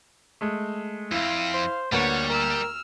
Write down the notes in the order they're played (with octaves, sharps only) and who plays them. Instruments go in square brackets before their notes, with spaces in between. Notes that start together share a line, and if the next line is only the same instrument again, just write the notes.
[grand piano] G#3 A3
[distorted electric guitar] F2 C4 [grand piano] E4 [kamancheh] F5
[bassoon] C5
[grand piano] D2 A#3 [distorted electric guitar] G3 [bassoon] B3 [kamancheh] C#5 F#5
[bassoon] A#4 [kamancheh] E6 F6